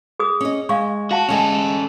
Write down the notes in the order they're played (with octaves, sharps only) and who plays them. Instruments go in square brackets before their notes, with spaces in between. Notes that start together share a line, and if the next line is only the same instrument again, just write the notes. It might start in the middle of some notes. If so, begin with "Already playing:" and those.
[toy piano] G#4 D#6
[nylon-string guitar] C#4 D#5
[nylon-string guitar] G#3 [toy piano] F5 C#6
[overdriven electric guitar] F#4 [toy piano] F5 A5
[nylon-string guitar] D2 G#3 G#5 [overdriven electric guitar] C#4 A4